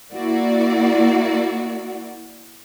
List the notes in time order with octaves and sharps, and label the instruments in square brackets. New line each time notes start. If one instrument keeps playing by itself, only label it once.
[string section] A#3 E4 F#4 D5